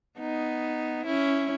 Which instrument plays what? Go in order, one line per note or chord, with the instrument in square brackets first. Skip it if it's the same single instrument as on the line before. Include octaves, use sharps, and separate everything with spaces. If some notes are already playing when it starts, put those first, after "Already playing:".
[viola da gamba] B3 D#4
C#4 E4